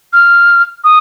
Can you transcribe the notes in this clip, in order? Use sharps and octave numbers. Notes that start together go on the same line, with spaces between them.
F6
D#6